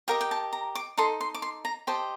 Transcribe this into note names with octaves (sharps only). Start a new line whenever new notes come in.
G4 A#4 D#5 F5
G5
A5
A#5
D6
D#4 A4 D#5 C6
C6
D6
C6
A#5
G4 C5 D#5 A5